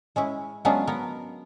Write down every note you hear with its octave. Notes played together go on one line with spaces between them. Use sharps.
G#3 C#4 E4
F#3 G#3 B3 C#4 D4 F4
B3 A#4